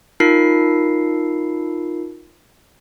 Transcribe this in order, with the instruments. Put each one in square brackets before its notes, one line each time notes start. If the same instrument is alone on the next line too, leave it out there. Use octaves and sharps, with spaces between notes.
[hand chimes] D#4 F4 A#4 C7